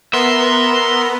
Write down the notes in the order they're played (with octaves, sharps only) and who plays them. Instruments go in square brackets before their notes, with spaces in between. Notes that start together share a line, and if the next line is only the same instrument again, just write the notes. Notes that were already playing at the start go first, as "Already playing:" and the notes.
[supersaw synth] B3 [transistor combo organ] A#4 [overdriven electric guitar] E5 [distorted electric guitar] C6